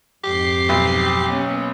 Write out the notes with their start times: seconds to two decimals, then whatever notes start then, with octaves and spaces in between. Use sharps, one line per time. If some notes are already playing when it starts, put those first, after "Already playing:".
0.24 F2 G#2 G4 C7
0.69 B1
1.29 A#3 B3 C#4